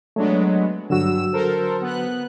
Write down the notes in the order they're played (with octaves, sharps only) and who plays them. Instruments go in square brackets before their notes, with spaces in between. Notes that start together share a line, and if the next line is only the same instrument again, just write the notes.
[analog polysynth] F#3 G#3 B3 [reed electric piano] A3 D4
[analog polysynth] G2 E6 E7 [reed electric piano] D3 F#3 F#4
[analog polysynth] A4 A#4 C5
B3 F#6